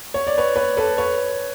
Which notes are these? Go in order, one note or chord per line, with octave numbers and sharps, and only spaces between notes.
C#5
D5
B4 C#5
B4 C#5
A4 B4
B4 C#5